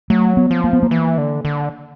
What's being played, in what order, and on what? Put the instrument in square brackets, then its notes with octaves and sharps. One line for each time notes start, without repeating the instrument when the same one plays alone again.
[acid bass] F#3 [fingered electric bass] A3
[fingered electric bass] B3
[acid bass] F3
[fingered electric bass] A#3
B3
A#3
[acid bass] E3
D3
D3